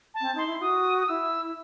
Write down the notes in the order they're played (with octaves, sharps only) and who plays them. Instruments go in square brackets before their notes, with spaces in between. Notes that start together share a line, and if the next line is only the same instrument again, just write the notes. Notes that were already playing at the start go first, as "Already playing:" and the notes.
[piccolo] A5
[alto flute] C4
[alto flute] D#4 [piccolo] C6
[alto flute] E4
[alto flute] F#4 [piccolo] D#6
[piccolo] D#6
[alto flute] E4 [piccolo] E6